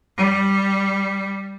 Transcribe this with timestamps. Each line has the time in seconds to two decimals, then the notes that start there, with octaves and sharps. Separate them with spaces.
0.17 G3